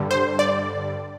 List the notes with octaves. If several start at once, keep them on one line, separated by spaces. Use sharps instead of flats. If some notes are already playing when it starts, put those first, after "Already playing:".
Already playing: G2 D3 G3
C5
D5